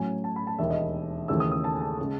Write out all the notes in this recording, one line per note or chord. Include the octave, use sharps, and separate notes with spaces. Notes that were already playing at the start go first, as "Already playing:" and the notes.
Already playing: A2 F#3 C#4 G#5
A5
B5
A5
E1 D#2 D#3 E5
D#5
D#2 C#3 E3 A3 E6
D#6
D#6
A5
G#5
A5
C#3 G#3